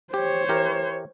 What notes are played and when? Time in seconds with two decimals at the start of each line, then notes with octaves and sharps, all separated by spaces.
0.14 G4 C5 C#5
0.49 E3 G4 A#4